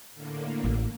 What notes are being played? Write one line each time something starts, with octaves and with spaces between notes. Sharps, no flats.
A2 D3 A#3
A1